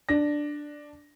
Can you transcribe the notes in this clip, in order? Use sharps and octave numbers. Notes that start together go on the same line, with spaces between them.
D4 A#6